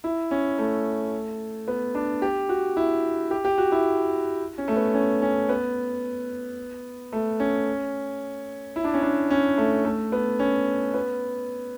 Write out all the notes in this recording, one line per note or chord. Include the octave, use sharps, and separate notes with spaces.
E4
C#4
A3
B3
D4
G4
F#4
E4
G4
G4
F#4
E4
C#4
A3
B3
C#4
C#4
B3
A3
C#4
E4
D4
C#4
D4
C#4
A3
A3
B3
C#4
B3